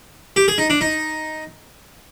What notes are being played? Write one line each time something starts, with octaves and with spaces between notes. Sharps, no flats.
G4
G#4
D#4
D4
D#4